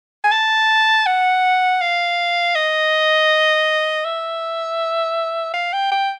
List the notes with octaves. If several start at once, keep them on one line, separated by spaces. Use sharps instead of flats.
G#5
A5
F#5
F5
D#5
E5
F5
G5
G5